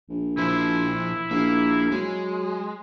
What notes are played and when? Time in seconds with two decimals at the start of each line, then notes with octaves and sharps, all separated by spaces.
0.09 A#1
0.38 A#2 F3 E4 C5
1.31 A#1 A#3
1.92 F#3 G#3